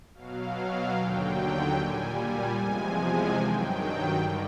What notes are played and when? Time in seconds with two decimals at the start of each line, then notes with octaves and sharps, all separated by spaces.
0.14 B2 F#3 F5
0.94 D#2 D3 F#3 G5
1.74 A#2 G3 G#5
2.15 G#5
2.55 E2 C3 F3 G#3 G#5
3.35 G2 D#3 F#3 G5
4.15 G2 D3 G3